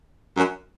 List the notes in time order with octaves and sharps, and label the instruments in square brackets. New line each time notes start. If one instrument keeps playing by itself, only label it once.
[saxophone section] F#2